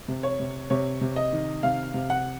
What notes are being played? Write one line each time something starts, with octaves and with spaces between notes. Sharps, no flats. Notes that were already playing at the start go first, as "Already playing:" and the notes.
C3
C#5
C3
C3 C#5
C3
D#5
D#3
C3 F5
C3
F#5